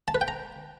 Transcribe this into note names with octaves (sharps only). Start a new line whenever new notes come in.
A5
B4
G5
A#5